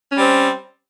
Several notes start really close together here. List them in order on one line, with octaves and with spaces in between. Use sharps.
C#4 G3 C4